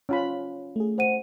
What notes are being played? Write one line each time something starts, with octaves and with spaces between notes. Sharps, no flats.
C#4 F4 B5
A3 G#4
C5 F#5 D#7